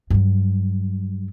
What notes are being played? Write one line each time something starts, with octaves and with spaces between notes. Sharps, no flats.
G2 F#3